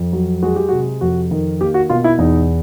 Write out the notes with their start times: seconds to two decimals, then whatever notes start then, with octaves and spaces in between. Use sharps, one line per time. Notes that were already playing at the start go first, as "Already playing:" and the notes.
Already playing: F2
0.13 F#3
0.43 G#3 F#4
0.56 G4
0.69 C3 F#4
1.01 F2 F#4
1.31 D#3
1.60 A#3 G4
1.74 F#4
1.90 B2 F4
2.04 E4
2.18 E2 D#4